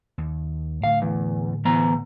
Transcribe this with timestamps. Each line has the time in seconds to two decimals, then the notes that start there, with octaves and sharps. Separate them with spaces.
0.18 D#2
0.84 A2 D3 A3 F5
1.02 E2
1.65 E3 B3 A#5